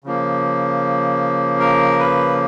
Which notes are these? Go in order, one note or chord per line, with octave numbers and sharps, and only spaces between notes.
C#3 F3 A#3
A#4
B4